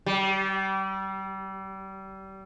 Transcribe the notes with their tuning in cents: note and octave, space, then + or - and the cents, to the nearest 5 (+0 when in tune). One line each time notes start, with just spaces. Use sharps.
G3 -30